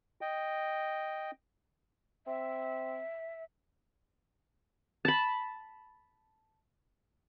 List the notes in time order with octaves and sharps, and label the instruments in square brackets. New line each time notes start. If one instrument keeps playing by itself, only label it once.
[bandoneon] D#5 G5
[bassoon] C4 [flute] E5
[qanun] A5 B5